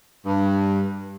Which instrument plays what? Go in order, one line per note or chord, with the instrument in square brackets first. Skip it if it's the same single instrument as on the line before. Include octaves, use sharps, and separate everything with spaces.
[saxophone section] G2